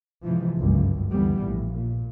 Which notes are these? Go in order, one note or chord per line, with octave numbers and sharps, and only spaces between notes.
G#2 C3 E3 F3
G1 C#2 F#2
D2 G2 E3 G3 B3
A#1 A2
A#2